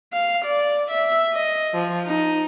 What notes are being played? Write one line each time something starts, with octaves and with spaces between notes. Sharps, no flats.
F5
D5
E5
D#5
F3
D#4